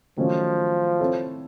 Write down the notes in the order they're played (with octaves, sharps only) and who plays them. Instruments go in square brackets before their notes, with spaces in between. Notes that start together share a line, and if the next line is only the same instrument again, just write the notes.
[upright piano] D#3 F#3 A3 C#4 [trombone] F3
[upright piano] C4 E4 A4 C#5